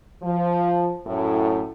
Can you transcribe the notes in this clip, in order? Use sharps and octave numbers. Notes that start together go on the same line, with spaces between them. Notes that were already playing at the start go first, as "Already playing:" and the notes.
F3
F#2 A2